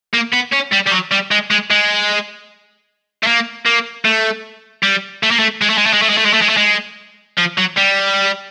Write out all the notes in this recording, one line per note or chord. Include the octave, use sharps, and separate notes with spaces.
A#3
B3
C#4
G3
G3
F#3
G3
G#3
G#3
G#3
A3
A#3
A#3
A3
G3
A3
A#3
A3
G#3
A3
G#3
A3
G#3
A3
G#3
A3
G#3
A3
G#3
A3
G#3
F3
F#3
G3